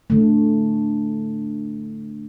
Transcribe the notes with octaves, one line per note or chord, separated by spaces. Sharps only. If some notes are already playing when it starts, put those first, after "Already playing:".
D3 A3